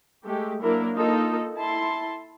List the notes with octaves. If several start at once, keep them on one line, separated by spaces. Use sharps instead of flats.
G#3 A3 G4
F#3 A#3 D4 E4 A#4
A#3 D#4 F4 A4 D#5
E4 A5 C6